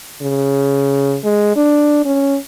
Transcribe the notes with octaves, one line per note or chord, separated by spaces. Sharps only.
C#3
G#3
D4
C#4